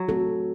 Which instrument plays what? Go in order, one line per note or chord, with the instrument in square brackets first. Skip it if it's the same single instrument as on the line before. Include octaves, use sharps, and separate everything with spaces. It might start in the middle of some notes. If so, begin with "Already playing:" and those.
Already playing: [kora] F#3
[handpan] A3 C4 F#4 A4